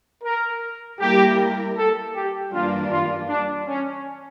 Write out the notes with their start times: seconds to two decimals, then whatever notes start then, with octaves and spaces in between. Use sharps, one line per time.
0.23 A#4
0.99 G3 A#3 E4 G4 A#4
1.76 A4
2.14 G4
2.52 G2 E3 G3 A#3 D4 F4
2.90 F4
3.29 D4
3.68 C#4